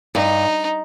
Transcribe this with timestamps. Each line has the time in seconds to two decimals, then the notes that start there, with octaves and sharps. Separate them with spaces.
0.14 G2 D#4